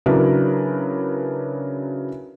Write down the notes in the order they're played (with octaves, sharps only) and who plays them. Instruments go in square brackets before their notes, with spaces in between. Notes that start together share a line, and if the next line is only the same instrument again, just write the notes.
[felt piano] C#3 F#3 D4 E4 A#4 B4